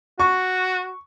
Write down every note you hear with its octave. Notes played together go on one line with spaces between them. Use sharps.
F#4 C#6